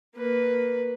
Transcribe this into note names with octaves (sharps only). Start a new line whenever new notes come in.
A#3 B4